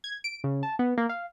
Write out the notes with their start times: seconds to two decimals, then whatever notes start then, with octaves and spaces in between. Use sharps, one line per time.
0.04 G#6
0.24 D7
0.44 C#3
0.63 A5
0.79 B3
0.98 A#3
1.09 F5